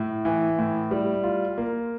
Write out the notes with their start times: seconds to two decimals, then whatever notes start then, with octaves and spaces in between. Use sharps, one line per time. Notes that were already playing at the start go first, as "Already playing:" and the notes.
Already playing: A2
0.25 E3
0.59 A2
0.91 G3
1.24 F4
1.58 A#3